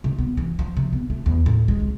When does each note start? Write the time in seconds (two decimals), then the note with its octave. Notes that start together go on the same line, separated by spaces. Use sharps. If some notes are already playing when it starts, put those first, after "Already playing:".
0.04 C3
0.19 B3
0.37 E3
0.59 F3
0.77 C3
0.93 B3
1.10 A3
1.26 E2
1.46 A2
1.68 G#3
1.80 C2